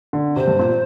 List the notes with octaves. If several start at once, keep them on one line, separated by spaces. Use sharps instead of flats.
D3
C3 C5
G2
A#2